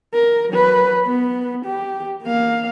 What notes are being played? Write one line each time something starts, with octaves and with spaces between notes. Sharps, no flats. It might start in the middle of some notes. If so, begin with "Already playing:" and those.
A#4
F#3 B4
B3
G4
A#3 F5